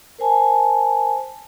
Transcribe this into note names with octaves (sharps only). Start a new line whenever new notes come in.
A#4 C5 G#5 A5